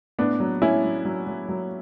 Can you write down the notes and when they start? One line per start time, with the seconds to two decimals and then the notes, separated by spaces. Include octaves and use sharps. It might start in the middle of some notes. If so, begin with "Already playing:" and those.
0.19 A2 B3 D4
0.40 F#3
0.62 A2 C#4 E4
0.84 F#3
1.05 F#3
1.27 F#3
1.49 F#3